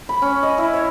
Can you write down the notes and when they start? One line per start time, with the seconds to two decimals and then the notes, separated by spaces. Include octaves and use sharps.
0.09 B5
0.22 C#4
0.43 D#5
0.58 E4
0.73 C#5